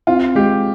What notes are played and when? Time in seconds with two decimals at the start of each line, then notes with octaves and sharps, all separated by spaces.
0.07 C4 F4
0.35 G#3 G4